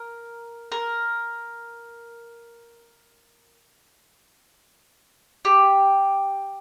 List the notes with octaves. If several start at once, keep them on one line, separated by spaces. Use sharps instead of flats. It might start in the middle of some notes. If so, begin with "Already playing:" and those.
Already playing: A#4
A#4
G4